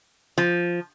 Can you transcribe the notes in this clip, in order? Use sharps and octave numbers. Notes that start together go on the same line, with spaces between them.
F3